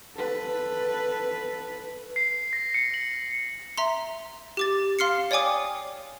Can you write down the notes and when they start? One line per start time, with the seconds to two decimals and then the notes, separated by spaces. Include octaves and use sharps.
0.15 A4 B4
2.16 C7
2.53 A#6
2.74 C#7
2.94 F#7
3.77 E5 A#5 C6
4.57 G4 D6 A6
4.99 F5 C6 F6 C7 C#7
5.31 C#5 D5 G5 G#5 D6 D#6